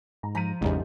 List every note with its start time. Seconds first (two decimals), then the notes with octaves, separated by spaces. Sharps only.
0.23 G#2 A#5
0.35 F3 A#5 B6 D#7
0.61 A1 E2 G#2 C#3 G3 D#4